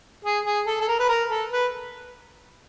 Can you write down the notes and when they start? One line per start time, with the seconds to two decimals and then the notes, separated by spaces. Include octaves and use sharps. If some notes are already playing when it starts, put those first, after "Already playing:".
0.25 G#4
0.46 G#4
0.67 A4
0.81 A4
0.88 A#4
0.99 B4
1.09 A#4
1.30 A4
1.51 B4